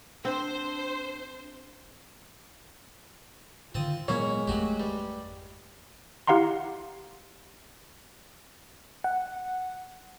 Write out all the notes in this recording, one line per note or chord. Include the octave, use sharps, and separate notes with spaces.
C4 D4 C5
G#2 D3 D#3 C4 F4 A5 D#6
A#2 F#3 G#3 A#3 B3 E4 A#4 C#5
G#1 F2 F#3 A3 F#4 G4
G2 G3
E4 G4 F5 F#5 A#5 C6
F#5